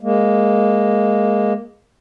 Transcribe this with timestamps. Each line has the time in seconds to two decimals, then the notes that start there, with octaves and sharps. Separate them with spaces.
0.01 G#3 A#3